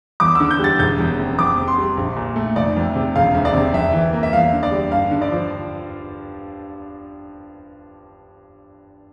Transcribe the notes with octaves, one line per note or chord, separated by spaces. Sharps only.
E2 D6
D3 E6
G6
G3 A6
E1 G6
E2
C3
F2 D6
C3
C6
G3
A#1
A#2
A3
F1 D5
F2
C3
E1 F5
D2
D5
C3
F2 E5
E3
A#3
E5
E2 F5
D3
D5
G3
G2 F5
D3
D5
F3